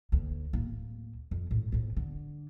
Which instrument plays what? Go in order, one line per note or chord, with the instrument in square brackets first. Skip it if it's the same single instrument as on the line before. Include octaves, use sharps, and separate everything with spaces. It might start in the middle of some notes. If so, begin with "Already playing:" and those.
[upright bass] D2 A#3
D1 A#3
F2
G#1 A2
F2 A2
D3